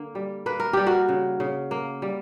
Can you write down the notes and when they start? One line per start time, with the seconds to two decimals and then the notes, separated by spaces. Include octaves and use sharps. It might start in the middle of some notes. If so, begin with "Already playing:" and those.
Already playing: D3 A#3
0.15 G3
0.46 A#3 B4
0.60 A#4
0.73 G3 G4
0.86 F#4 A#4
1.08 C#3
1.40 C#3
1.71 A#3
2.02 G3